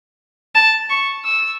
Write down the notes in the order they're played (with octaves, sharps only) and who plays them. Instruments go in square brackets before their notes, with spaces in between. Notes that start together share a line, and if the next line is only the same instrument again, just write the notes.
[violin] A5
C#6
E6